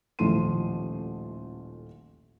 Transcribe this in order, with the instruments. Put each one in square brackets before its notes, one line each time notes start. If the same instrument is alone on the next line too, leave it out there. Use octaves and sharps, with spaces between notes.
[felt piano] D#1 A1 F3 A3 C6 D#7